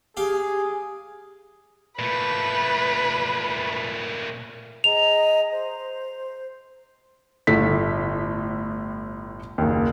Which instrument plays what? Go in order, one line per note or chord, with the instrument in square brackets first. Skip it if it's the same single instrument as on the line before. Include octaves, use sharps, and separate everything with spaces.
[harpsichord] G4 F5 [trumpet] G#4
[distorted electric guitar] A#2 A3 [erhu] B4
[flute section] G#4 D#5 A#5 [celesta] F7
[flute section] C5
[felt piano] G1 A2 A4 B6
F#1 D#2